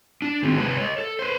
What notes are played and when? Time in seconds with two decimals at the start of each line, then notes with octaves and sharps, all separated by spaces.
0.22 D4
0.43 D#3 F#3 G#3 C4
0.57 C3 G#3 B4 A5
0.78 C#5 D#5
0.98 A4
1.19 B4 C5